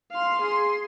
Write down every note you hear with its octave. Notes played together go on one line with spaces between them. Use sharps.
F5 C6
G#4 C6